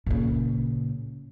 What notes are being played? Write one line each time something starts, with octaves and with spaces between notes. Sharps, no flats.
A#2 C#3